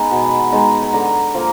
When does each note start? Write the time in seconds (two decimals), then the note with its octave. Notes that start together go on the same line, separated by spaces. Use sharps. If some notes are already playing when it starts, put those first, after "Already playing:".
Already playing: G#3 B3 D#4 G#5
0.11 B2
0.52 G#3 B3 D#4
0.83 B5
0.93 D3 A#5
1.34 F3 A#3